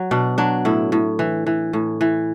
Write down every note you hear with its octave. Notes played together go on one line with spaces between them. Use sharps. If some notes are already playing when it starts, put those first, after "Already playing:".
Already playing: F#3
B2 D4
F#3 D4
A2 E4
A2
E3
E3
A2
E3